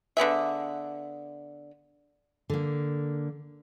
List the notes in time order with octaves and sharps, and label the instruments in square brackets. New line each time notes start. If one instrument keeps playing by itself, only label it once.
[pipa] D3 B3 G#4 E5
[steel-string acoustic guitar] D3 A#3